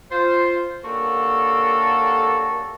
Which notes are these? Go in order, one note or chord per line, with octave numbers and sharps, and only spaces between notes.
F4 C5
D3 A#3 C#4 F#4 G4 A4